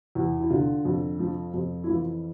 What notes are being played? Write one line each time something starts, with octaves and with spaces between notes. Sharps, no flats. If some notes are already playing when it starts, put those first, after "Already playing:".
E2
E4
D3 F4
F2
F3
F2
E4
E3 F4